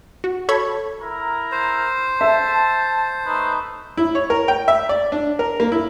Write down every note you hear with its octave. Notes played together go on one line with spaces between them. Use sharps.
F#4
A4 C#5 B5 C#6 G#6
E4 A#4 A#5
C5
E5 A5
A3 D#4 B4
E4
C#5
A#4
G5
E5
D5
D4
A#4
A#3
E4